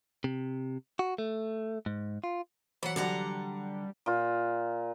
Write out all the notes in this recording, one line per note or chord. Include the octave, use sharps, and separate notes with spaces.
C3
F#4
A3
G#2
F4
E3 F#3 F#5 B5
D3 F#3 G3 F#4 F#5 A#5
A#2 F4